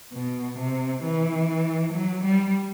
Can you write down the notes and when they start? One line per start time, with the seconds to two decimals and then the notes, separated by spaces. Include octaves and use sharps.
0.13 B2
0.58 C3
1.03 E3
1.93 F#3
2.23 G3